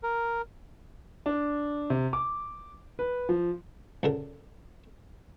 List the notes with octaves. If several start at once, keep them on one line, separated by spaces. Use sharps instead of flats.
A#4
D4
C3
D6
B4
F3
C#2 D3 A#4